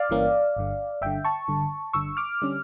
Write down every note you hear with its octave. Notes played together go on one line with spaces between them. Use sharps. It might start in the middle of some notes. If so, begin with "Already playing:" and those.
Already playing: D5 F5
G1 G2 E3 A#3 C#4
G1 G2 D3
G1 G2 D3 E5 G5
A5 C#6
G1 G2 D3
G1 G2 D3 C#6 E6
D6 F6
D3 G3 C#4